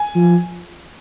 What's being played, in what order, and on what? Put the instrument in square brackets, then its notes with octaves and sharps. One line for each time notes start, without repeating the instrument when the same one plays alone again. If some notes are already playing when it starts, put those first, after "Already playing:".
Already playing: [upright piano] G#5
[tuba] F3